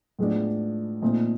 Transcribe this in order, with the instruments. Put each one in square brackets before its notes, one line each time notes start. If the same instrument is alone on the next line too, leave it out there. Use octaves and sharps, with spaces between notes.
[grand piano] A2 F3 G#3 B3 D4
A#2 F3 A3 C4 D#4